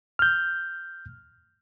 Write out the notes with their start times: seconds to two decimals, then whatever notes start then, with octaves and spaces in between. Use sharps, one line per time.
0.19 F6 G6